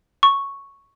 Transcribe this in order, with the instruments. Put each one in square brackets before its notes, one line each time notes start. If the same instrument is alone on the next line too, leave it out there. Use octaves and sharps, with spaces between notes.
[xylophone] C#6